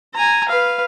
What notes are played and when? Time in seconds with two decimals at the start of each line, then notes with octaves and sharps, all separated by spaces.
0.14 G#5 A#5
0.48 B4 F5